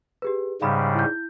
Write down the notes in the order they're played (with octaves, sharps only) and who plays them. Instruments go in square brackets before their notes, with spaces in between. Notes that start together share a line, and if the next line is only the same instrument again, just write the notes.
[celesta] G4 G#4 B4
[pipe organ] G#2 C#3 G3 [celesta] F5 B5
[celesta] E4 G6